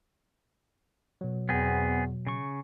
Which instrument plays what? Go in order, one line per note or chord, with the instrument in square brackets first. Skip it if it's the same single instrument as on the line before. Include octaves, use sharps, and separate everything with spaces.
[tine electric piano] B2 F#3
[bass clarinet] E2 [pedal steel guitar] B3 C4 G#4
[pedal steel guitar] C#3 C#6